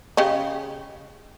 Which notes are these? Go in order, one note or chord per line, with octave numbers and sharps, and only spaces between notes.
C#3 G4 D#5